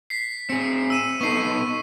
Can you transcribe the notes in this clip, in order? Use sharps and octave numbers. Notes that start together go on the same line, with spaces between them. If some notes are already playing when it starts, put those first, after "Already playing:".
B6 C7
C4 G#4 C#7
E6 D#7 E7
B3 D#4 A4 C#6 C7